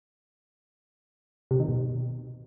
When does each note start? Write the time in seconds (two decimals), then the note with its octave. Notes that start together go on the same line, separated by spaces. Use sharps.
1.51 C3
1.60 D#3
1.69 B2